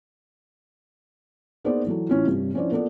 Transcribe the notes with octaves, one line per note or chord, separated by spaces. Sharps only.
A#3 B3 D#4 G#4 C5 D5
E3 F#3 A4
A2 E3 C#4 F4
G2 C3
F3 C#4 D4 E4 C5 D5
A#3 B3 F4 A4 D5